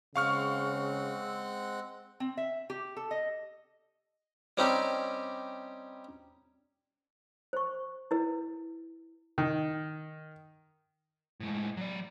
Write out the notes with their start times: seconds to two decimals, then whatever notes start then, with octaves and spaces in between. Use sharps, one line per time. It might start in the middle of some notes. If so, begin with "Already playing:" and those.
0.16 C#3 G#3 C4 F5 F#5 C#6 F6
2.20 C4
2.37 E5
2.70 G4
2.97 A4
3.11 D#5
4.57 G3 C4 C#4 D#4 G4
7.53 C5 C#6
8.11 E4 B4
9.38 D#3
11.40 A2 G#3
11.77 F#3 D5